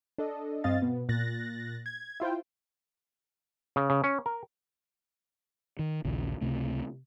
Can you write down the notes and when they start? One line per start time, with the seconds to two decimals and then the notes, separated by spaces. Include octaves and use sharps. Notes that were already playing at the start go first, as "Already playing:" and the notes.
0.18 D4 A4 D#5
0.64 G2 C4 D#5 F5 A6
0.82 B2 B3
1.09 A#2 F#6 A6 A#6
1.86 G#6
2.20 E4 F4 C5 G5
3.76 C#3
3.90 C#3
4.04 C#4
4.26 A#4
5.79 D#3
6.04 A#1 D#2 C#3
6.41 C#2 C3 A3